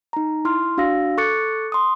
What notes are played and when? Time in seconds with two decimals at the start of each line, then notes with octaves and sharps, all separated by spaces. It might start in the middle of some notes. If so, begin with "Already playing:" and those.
0.13 D#4 A#5
0.45 E4 C6 F6
0.78 D4 F#4 F5 E6 A#6
1.17 A4 C#6 D6 F#6 A6 C#7
1.72 C6 D#6